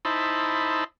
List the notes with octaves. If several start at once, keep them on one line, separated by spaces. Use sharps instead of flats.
D#4 E4 C5 A5 B5